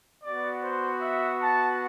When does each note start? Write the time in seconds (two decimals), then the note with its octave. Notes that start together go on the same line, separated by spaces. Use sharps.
0.22 B3 F#4 D5
0.63 C5
1.01 E5
1.41 A5